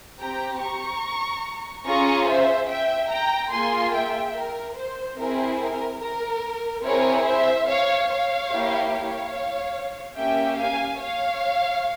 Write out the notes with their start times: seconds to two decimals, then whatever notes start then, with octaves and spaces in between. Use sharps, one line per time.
0.19 C4 G4 G5 A#5
0.61 A#5 C#6
1.85 C#4 F4 G#4 A#5 C#6
2.27 C5 E5
2.69 E5 G5
3.10 G5 A#5
3.52 A#3 F4 G#4 G#5 C6
3.93 E5 G5
4.36 A#4
4.77 C5
5.18 C4 E4 G#4 A#4
5.60 A#4
6.01 A#4
6.84 C4 E4 G#4 A#4 C#5
7.26 C5 E5
7.67 C#5 F5
8.09 C#5 F5
8.50 A#3 E4 G4
8.92 C#5 F5
10.17 A#3 C#4 G4 E5 G5
10.58 F5 G#5
11.00 C#5 F5